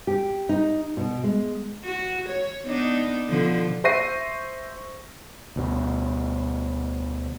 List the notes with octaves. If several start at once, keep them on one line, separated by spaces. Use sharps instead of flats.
G4
D#4
B2
G#3
F#4
C#5
B3 D4 D#4
B2 D3 F3
C5 E5 C#6 A#6 C7 D#7
D2 B2